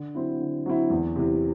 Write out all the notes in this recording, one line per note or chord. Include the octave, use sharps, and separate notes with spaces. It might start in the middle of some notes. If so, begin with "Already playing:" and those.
Already playing: D3
F#3 C4 E4
D3
F#3 C4 E4
E2
C3 E3